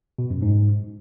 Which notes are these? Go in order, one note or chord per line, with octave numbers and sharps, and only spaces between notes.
B2
F#2
G#2